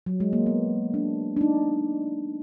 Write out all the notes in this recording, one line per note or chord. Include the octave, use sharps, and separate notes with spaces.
F#3
G#3
A#3
B3
D4
D4
D#4